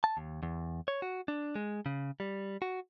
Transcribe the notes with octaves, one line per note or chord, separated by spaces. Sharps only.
A5
D#2
E2
C#5
F#4
D4
G#3
C#3
G3
F#4